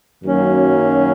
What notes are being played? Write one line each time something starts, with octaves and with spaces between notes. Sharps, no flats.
F#2 D#3 F#3 A#3 C#4